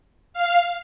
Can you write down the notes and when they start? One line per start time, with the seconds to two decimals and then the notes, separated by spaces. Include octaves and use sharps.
0.34 F5